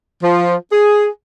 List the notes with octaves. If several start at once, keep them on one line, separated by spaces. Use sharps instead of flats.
F3
G#4